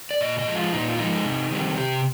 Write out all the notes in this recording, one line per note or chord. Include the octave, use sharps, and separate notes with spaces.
D5
A#2 D#5
D#5
F3 G#3
F4
A#2 D#4
F4
F3 G#3 D#4
C3
D#3 G3 C4
C3 G4